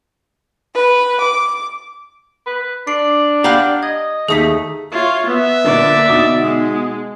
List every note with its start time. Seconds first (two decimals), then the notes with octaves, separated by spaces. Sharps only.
0.74 B4
1.20 D6
2.46 B4
2.87 D4 C7
3.44 G4 F5 F#5 A#5 B5 F6
3.83 D#5 G#6
4.28 D#2 A3 D#4 G#4 D#6 B6
4.92 F4 C#5 E5
5.27 B3 B4 E5
5.64 A#2 D3 A#3 D5
6.10 B2 D#4 D#6
6.42 G#3